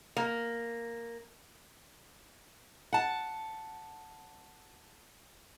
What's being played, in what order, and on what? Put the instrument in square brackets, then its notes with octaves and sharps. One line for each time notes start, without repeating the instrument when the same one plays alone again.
[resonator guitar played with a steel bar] A#3
[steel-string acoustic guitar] F#5 A5